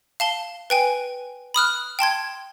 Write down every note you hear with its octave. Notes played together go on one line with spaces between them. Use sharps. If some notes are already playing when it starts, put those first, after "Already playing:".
F5 A5 G7
B4 G5 G#5
B5 D#6 F6 F#6
G5 A5 C6 G#6